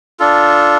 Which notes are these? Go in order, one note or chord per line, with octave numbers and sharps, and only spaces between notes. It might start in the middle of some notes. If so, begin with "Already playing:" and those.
D4 F4 A4